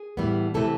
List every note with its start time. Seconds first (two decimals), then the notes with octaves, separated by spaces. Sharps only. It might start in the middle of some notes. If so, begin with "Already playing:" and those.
Already playing: G#4
0.17 A2 E3 G3 B3
0.54 C3 E3 A3 C4 A4